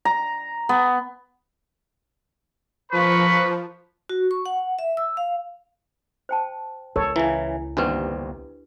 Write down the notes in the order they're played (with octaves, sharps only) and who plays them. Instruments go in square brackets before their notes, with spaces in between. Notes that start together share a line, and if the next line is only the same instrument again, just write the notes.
[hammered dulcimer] A#5
B3
[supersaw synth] F3 [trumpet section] A#4 B5 C#6 [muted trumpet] B4
[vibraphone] F#4
C#6
F#5
E5
E6
F5
[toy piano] C5 G5 A5
[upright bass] C#2 [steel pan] A4 C#5 [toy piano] A#4
[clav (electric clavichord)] C#3 E3 [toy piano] E4 G#5
[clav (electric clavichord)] G1 D#2 C4 [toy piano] D4 G4 B4